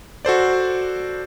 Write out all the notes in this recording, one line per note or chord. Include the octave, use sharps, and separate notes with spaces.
F#4 A4 C5 D5